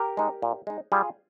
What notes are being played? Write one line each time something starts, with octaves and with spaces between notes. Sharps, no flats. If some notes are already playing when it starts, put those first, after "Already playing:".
Already playing: G4 A#4
G#3 D#4
A#2
G#3 D#4
G3 F4 G#4